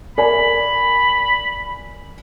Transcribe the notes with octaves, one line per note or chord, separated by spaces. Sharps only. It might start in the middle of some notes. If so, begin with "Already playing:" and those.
A#4 D5 G#5 B5